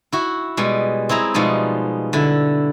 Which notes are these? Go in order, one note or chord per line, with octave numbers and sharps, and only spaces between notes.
E4 F#4
B2 G3 G#3
C4 E4 G#4 A#5
B2 F3 G3 G#3 D#4
D3 E4